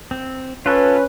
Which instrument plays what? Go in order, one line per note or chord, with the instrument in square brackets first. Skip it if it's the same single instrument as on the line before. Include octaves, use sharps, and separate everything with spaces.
[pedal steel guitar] C4
[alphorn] C#4 [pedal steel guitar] F4 A4 C#5 [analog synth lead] B4